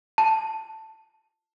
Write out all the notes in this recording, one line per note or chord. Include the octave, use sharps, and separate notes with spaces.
A5